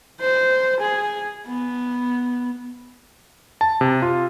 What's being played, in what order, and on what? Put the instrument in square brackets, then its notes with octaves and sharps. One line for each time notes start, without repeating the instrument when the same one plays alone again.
[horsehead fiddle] C5
G#4
B3
[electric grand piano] A5
C3
F4